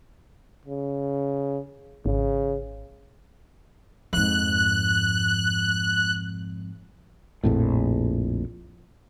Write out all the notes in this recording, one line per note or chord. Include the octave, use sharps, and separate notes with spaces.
C#3
G#1 C#3
F2 G#2 F#6
A#1 F2 A2